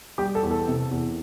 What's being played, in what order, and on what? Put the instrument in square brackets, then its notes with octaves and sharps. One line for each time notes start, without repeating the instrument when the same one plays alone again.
[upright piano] G3 G4
A4
E2
A4
C3
E2